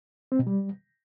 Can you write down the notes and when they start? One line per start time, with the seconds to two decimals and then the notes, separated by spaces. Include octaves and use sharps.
0.32 C4
0.39 B2
0.47 G3